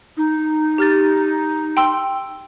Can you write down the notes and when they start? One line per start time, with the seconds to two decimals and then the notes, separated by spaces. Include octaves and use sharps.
0.17 D#4
0.78 G4 F6 A6
1.77 G5 C6 E6